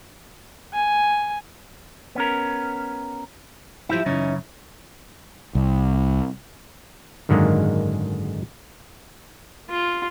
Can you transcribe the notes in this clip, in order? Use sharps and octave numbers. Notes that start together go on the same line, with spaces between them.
G#5
B3 C#4 A#4
F3 E4 G4 E5
F#2 C#3 E3 C#4 D#4
C2
G#1 F#2 D3 D#3 G#3 A#3
F4